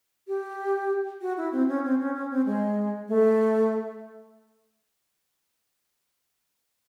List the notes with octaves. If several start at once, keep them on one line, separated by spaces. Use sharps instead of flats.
G4
F#4
E4
C4
C#4
C4
C#4
C#4
C4
G#3
A3